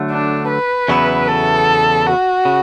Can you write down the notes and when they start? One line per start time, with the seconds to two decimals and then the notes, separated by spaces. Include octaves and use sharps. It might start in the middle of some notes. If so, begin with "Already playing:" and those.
Already playing: D3 F#3 A3
0.11 D4
0.49 B4
0.88 E2 C#3 F#3 B3 E4
1.28 A4
2.06 F#4
2.45 C#3